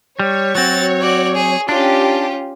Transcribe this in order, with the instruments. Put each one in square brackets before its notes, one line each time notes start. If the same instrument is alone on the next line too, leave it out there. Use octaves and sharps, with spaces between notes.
[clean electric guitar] G3 [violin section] C#5
[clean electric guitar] F#3 C4 [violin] F#4 A6
[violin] F#4 D5
G#4
[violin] C#4 F4 [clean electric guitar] D4 [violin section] G4